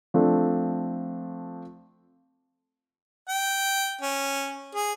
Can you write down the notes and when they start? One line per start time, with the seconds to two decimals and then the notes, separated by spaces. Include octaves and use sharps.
0.14 F3 A3 C4 D4 F4 A4
3.29 G5
4.01 C#4
4.75 G#4